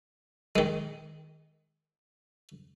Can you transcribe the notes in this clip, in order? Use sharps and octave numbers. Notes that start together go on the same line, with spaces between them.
D#3 G#3